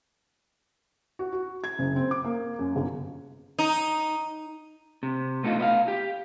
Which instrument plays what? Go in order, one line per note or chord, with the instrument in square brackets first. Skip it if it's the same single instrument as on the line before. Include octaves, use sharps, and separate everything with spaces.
[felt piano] F#4
F#4
G#6
F#1
C4
D6
A#3
F#2
G1
[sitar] D#4
[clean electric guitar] C3
B2 A3 B3 D#4 F4
B3 D#5 F5
G4